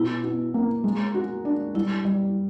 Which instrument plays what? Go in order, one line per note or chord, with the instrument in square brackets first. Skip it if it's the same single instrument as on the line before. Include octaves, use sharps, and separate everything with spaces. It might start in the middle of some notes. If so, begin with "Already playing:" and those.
Already playing: [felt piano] B2 [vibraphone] E4
[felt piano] B2
A#3
G#3
F#4
D4
[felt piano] G3 [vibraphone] E4
[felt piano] G3